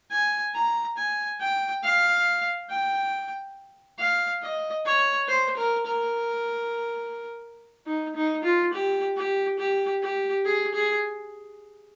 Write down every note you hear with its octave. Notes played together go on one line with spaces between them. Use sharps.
G#5
A#5
G#5
G5
F5
G5
F5
D#5
C#5
C5
A#4
A#4
D#4
D#4
F4
G4
G4
G4
G4
G#4
G#4